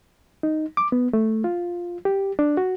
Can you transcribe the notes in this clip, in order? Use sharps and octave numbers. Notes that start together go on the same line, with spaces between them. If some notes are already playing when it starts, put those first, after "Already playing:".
D#4
D6
B3
A3
F4
G4
D4
F#4